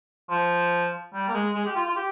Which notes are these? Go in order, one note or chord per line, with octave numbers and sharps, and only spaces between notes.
F3
G3
A#3
G#3
G#3
G4
F4
F4
G4